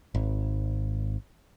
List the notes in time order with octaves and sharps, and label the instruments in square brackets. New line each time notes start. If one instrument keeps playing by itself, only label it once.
[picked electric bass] G#1